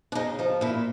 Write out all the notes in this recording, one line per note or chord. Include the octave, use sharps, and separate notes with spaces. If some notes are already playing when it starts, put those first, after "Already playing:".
D4
C#3 D#4
F3 D#4
A#2 E4